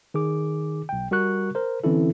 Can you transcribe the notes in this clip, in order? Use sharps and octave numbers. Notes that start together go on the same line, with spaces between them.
D#3 G#4 D6
B1 G5
G3 F#4 A#4 C#6 F#6
A#4 C5
D3 E3 C4 C#4 E4 A4